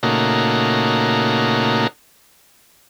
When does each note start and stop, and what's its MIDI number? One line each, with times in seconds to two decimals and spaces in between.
0.03 1.87 46
0.03 1.87 49
0.03 1.87 57
0.03 1.87 58
0.03 1.87 63
0.03 1.87 66